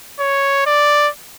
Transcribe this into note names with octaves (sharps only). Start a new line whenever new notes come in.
C#5
D5